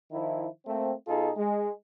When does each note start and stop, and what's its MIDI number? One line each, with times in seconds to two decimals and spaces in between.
0.11 0.47 51
0.11 0.47 53
0.11 0.47 64
0.66 0.93 57
0.66 0.93 58
0.66 0.93 60
1.06 1.30 47
1.06 1.30 63
1.06 1.30 65
1.06 1.30 68
1.06 1.30 69
1.37 1.70 56